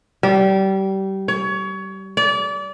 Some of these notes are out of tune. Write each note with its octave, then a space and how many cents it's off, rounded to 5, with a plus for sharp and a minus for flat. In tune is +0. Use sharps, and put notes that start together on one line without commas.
G3 -25
C#5 +25
D5 -30